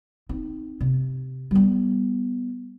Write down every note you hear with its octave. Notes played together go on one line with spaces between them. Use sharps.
C4 D#4
C3
G3 B3